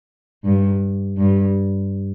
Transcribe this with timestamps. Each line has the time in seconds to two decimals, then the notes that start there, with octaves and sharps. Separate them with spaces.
0.44 G2
1.18 G2